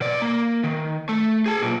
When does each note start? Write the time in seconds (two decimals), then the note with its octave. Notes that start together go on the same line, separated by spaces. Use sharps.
0.01 B2 D5
0.22 A#3
0.64 D#3
1.09 A3
1.46 G#4 A5
1.62 B1 A#2